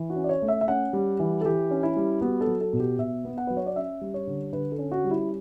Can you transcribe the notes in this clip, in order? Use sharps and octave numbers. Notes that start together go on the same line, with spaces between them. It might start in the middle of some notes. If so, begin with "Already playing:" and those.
Already playing: E3
F#4
C#4
D5
C#5
A3
E5
E5
C#4 F#5
G3
E3
A4
E3 G4
C#4
E4
G3
B3 F#4
A4
F#3
A4
B2
G4
B2 E5
B3
F#5
F#3 B4
C#5
D5
C#4 E5
G3
C#5
D3
D3 B4
A4
C#4
F#4
G3
E4